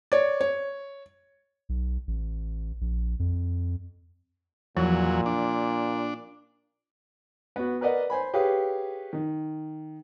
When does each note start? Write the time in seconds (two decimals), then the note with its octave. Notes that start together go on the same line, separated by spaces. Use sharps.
0.12 C#5 D5
0.41 C#5
1.69 B1
2.07 A1
2.81 A#1
3.19 F2
4.77 E2 A#2 F3 F#3
5.26 D4
7.56 B3 F#4
7.81 A#4 B4 D5 D#5 F#5
8.10 C5 G#5 B5
8.34 G4 G#4 B4 C#5 F5
9.13 D#3